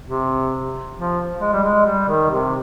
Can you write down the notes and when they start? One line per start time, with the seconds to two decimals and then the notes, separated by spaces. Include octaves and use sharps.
0.06 C3
0.96 F3
1.40 G#3
1.53 G3
1.63 G#3
1.85 G3
2.08 D#3
2.31 C3